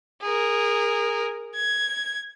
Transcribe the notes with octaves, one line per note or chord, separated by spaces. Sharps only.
G#4 A#4
G#6